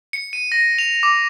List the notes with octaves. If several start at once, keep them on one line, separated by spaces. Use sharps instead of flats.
C#7
D#7
A#6
F7
D6